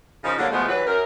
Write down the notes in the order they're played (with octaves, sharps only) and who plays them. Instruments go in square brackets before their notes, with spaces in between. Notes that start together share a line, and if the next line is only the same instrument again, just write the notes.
[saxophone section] C#3 F3 D#4
D3 F#3 G3 A#3
B2 F3 G#3 A3 B3
E3 F#3 G3 B4
F#2 A#4